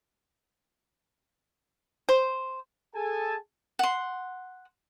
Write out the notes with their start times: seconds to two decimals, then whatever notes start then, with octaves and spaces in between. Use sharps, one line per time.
2.09 C5
2.95 G#4 A4 G#5 A5
3.79 F#5 C6